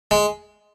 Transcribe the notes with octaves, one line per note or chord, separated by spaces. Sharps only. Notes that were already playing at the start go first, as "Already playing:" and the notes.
G#3